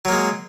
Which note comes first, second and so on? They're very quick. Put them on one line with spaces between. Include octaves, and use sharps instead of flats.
F#3 A#3 G#3